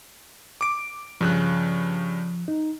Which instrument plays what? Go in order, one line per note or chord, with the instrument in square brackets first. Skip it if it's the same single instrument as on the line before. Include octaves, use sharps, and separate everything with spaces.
[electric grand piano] D6 D7
[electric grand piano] G2 C#3 F#6 [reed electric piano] F3
[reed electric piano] D#4